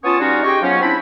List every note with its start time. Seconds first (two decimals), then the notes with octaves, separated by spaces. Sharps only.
0.04 B3 C#4 F4 C#5 A5 D#6
0.20 G3 C#4 D#4 F4 F#4
0.44 D#4 G4 G#4 D#5 G5 C#6
0.62 F3 F#3 B3 C#4
0.82 C4 D4 E4 B5